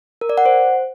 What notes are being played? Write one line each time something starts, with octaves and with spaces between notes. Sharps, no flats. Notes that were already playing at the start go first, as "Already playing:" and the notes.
A#4
D5
F#5
C5